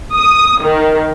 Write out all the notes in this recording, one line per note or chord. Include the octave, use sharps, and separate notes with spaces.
D#6
D#3